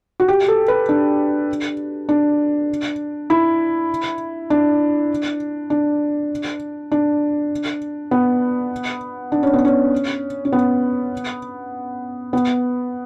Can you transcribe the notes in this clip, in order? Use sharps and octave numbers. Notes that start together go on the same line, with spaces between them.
F#4
G4
A4
B4
D4
D4
E4
D4
D4
D4
B3
D4
C#4
B3
C#4
C#4
B3
B3